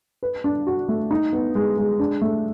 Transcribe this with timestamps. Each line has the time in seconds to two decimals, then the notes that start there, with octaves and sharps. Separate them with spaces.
0.23 B4
0.44 D4
0.67 F#4
0.89 A3
1.11 D#4
1.33 B3
1.55 G#3
1.77 G#3
2.00 D4
2.22 A3